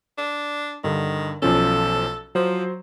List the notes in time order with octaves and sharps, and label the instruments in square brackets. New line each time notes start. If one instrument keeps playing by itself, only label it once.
[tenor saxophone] D4
[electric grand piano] G2 D3 [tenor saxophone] D#3
[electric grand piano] B1 F3 C#4 [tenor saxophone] A4
[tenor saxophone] F3 [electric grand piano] F#3 C5